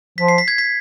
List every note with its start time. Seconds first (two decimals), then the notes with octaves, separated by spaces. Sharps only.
0.18 F3 B6
0.28 C7
0.38 B6
0.48 G#6
0.58 B6